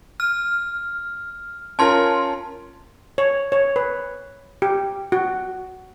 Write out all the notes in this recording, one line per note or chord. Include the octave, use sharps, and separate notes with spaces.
F6
C#4 F4 A#4 A5 C6
C#5
C#5
B4
G4
F#4